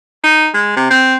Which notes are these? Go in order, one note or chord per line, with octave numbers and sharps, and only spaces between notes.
D#4
G#3
C3
C4